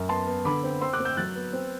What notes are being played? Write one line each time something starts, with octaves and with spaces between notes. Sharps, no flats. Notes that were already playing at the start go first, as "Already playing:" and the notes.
Already playing: F#2
B3 A5 C6
B3
D3 B5 D6
C4
C4 C6 E6
D6 F#6
C4
E6 G6
F#3 F#6 A6
B3
C4